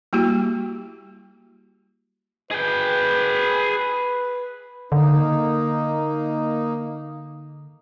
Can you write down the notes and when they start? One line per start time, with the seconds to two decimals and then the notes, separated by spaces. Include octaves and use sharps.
0.13 G3 A#3 E4 F#4 G4
2.51 G#4 B4 G5
4.92 D3 A#3 D#4